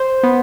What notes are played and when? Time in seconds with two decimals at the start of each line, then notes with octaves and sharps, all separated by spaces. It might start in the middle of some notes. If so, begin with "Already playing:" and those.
Already playing: C5
0.23 B3